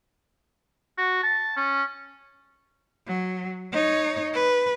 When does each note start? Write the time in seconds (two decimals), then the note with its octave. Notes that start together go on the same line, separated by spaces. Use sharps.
0.98 F#4
1.23 A5
1.57 C#4
3.07 F#3
3.72 D#4 C#5
4.33 B4